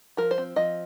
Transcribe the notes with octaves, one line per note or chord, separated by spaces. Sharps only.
F3 A#4
C5
C4
F3 D#5